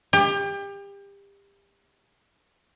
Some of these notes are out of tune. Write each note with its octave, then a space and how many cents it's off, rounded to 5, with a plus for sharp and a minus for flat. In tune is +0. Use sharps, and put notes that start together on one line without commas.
G4 +30